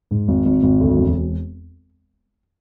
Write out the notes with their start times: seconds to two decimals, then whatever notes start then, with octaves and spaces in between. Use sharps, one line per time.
0.11 G#2
0.28 G#1
0.45 G#1
0.63 G#1
0.81 D2
0.98 E1